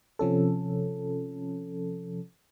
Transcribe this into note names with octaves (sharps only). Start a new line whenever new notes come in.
C3 F3 C#4 A4